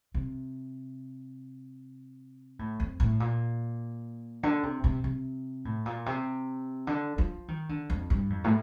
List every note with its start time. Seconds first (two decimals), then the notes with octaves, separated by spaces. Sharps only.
0.14 C3
2.59 A2
2.80 F2
3.00 A2
3.20 A#2
4.43 D3
4.63 C3
4.84 C3
5.04 C3
5.65 A2
5.86 A#2
6.06 C3
6.87 D3
7.18 F3
7.48 D#3
7.69 D3
7.90 F2
8.10 G2
8.30 F2
8.44 A2